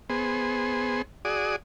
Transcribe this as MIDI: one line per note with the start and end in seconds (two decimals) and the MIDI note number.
0.10 1.02 59
0.10 1.02 68
0.10 1.02 72
1.25 1.56 66
1.25 1.56 68
1.25 1.56 74
1.25 1.56 87